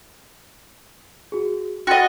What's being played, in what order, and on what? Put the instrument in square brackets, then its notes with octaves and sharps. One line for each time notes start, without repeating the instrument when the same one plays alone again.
[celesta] F#4 G#4
[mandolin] F#4 D#5 [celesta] G5 C6 A6